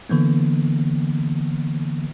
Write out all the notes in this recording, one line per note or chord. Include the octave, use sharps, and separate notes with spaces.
D3 E3 A#3 B3